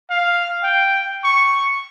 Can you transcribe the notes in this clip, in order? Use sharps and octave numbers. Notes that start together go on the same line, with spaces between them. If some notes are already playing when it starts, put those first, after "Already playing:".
F5
G5
C#6